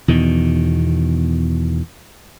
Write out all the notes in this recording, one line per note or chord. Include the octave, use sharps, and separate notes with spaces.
E2 B2 D#3